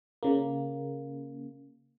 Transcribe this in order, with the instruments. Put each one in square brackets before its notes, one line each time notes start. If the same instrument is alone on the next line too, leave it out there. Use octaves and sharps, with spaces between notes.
[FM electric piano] C#3 A#3